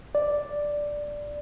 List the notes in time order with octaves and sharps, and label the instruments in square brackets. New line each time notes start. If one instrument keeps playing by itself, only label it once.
[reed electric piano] D5